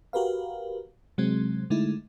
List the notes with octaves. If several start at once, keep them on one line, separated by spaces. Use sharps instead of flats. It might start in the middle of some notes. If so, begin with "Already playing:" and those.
F#4 G4 A#4 B4 F5
C3 F#3 G#3 C4
D3 G#3 A3 D#4 E4